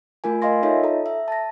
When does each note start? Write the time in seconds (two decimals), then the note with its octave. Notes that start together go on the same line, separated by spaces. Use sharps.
0.24 A3 F4 A#4 G#5
0.42 A#4 D#5 F5 G#5 C6 A#6
0.63 D#4 F4 A4 C#5 D#5 E5
0.84 A4 A#5
1.06 E5
1.28 A5 A#6